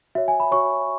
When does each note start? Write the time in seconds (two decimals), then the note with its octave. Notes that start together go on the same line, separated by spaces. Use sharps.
0.15 F#4 C#5 E5
0.28 G#5
0.40 B5
0.51 F#4 C#5 C#6